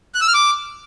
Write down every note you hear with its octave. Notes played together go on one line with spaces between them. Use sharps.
F#6
E6
F6
D6